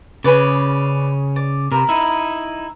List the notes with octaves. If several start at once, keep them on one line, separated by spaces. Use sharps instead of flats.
C#3 C#4 B4 D5
D5
C3 A#4 B5
D#4 E4